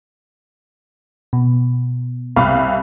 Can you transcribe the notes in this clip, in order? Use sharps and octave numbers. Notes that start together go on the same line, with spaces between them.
B2
C2 F5 B5